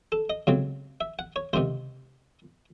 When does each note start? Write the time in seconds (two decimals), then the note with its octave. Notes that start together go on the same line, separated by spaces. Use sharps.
0.12 A4
0.30 D#5
0.47 C#2 C#3 F#3 C4
1.01 E5
1.19 F#5
1.36 C#5
1.53 C#2 C3 D#3 C5